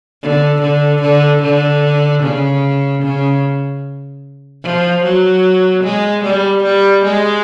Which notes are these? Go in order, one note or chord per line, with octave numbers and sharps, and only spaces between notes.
D3
D3
D3
D3
C#3
C#3
F3
F#3
G#3
G3
G3
G#3